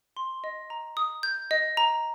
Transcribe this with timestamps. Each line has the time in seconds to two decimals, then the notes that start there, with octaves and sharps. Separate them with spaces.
0.17 C6
0.44 D#5
0.70 A#5
0.97 D#6
1.23 G6
1.51 D#5
1.77 A#5